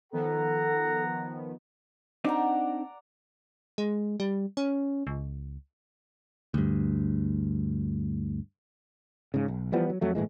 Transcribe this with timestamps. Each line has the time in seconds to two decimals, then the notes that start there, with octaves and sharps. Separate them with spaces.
0.13 D#3 F3 B3 A4 F#5 A#5
2.24 C4 D4 D#4 D5 F#5 A#5
3.78 G#3
4.20 G3
4.57 C#4
5.07 C#2
6.54 D2 G2
9.34 G#2 C#3
9.48 B1
9.72 E3 F3 G3 B3
9.90 F#3
10.01 F2 F#3 A3
10.15 G1 A2 E3 G#3